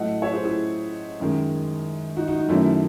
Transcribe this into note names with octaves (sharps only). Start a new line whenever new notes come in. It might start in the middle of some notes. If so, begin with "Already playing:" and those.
Already playing: A2 F#3 A3 D#5 F#5
C#5 E5
G#4 C5
E4 G#4
F#2 D#3 G#3
D#4 F#4
D#4 F#4
D#4
F#2 D#3 F#3 A3 E4